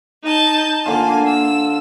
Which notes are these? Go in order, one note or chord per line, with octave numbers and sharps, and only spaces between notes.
D#4 A5 G6
D3 A#3 F4 G#5
E6